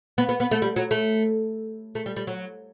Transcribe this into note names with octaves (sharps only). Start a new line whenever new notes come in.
B3
B3
B3
A3
G3
F#3
A3
A3
G3
G3
F#3